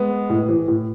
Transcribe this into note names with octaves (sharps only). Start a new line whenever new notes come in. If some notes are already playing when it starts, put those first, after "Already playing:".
Already playing: G#3 B3
A2
E3
A2